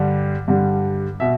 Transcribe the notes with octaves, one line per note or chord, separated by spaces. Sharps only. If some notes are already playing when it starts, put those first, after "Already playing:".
Already playing: G2 D3 G3
G2 D3 G3
B2 E5